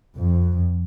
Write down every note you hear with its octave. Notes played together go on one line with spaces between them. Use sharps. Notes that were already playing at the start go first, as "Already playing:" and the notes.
F2